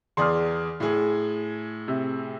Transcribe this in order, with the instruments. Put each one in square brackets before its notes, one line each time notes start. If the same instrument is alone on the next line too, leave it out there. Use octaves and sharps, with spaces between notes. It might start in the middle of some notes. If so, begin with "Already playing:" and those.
[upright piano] E2 G#4 D5 [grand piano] C6 D#6 F6
[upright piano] A2 G#4
[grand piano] C3